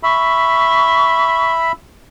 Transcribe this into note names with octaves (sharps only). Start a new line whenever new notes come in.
E5 B5 C#6